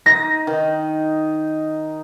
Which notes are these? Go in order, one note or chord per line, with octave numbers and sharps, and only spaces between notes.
D#4 A#6
D#3